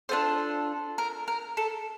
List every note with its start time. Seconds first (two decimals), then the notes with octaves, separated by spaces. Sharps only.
0.09 D4 F4 A4 C5
0.98 A#4
1.28 A#4
1.57 A4